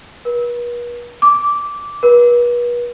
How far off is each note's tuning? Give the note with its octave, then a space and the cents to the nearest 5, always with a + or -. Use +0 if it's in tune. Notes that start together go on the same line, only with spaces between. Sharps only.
B4 -45
D6 -10
B4 -40